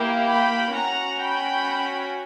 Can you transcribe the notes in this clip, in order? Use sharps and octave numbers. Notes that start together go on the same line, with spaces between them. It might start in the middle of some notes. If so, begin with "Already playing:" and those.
Already playing: A#3 E4 G4
G5 B5
C#4 F#4 F#5 A#5
G5 B5